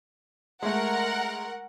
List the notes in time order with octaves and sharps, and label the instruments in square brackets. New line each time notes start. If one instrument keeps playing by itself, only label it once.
[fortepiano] G#3 A3 [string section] A#4 F#5